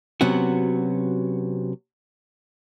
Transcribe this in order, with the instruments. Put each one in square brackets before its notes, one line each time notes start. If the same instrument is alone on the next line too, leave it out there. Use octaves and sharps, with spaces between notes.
[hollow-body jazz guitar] C3 F#3 B3 C#4 F#4